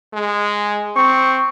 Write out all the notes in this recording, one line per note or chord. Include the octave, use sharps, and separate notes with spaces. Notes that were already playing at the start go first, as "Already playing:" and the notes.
G#3
C4 C#6